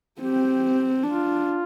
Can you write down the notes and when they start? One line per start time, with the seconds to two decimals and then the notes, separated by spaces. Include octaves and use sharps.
0.21 C4 G4
1.03 D4 F4